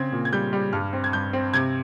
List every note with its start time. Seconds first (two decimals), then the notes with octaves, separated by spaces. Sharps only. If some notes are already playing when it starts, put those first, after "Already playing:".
Already playing: C#3 C4 G#6
0.12 A#2
0.25 G#6
0.33 G3 G6
0.53 G3
0.73 G2 F6
0.93 C4
1.04 G#6
1.13 G2 G6
1.33 C4
1.54 C3 G#6